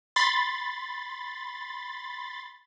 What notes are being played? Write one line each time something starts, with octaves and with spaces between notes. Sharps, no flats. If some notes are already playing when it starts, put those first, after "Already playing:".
B5 C6 A6